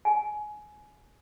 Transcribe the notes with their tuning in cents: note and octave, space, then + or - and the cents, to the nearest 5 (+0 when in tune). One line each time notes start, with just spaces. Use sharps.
G#5 +20